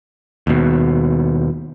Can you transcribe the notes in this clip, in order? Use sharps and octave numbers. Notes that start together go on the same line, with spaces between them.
D#2 B2